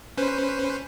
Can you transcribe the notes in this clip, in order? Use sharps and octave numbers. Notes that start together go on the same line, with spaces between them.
C#4 B4 C5